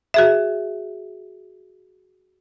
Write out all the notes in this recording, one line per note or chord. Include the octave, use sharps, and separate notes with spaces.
F#4 G#4 E5